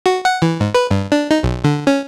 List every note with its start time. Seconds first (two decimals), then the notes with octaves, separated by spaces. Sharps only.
0.06 F#4
0.25 F#5
0.42 E3
0.60 G#2
0.75 B4
0.91 G2
1.12 D4
1.31 D#4
1.43 B1
1.64 D3
1.87 C#4